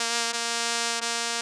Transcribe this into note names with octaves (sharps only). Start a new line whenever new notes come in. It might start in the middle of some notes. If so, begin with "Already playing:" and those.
Already playing: A#3
A#3
A#3